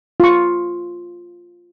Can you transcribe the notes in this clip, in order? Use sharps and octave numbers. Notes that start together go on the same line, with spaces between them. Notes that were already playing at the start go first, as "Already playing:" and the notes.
F4 C#6